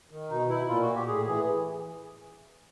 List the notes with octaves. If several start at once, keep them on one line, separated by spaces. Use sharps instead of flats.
D#3
B2 D#4
E4
A#2 F4
F#4
G4
A2 G#4
E3 G#4